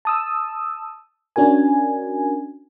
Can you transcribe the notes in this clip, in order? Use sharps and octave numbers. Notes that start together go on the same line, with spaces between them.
A5 D#6 E6
C#4 D4 F#4 A#4 G#5